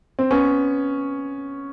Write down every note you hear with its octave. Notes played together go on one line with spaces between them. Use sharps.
C4
B3 C#4